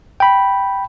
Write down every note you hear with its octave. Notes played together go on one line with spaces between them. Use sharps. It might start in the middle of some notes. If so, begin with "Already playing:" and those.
G5 B5